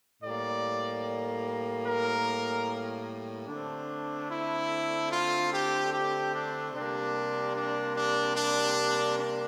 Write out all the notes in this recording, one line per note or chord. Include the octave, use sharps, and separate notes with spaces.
A2 G3 A#3 D5
A#4
D3 A3 C4 D4
E4
F4
G4
G4
D4
C3 G3 A#3 D4
D4
D4
D4
D4